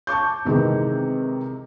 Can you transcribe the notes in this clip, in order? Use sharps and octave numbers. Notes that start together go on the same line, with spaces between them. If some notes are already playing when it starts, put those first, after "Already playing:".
A5 C#6 D6 G6
C3 D#3 E3 G#3 C4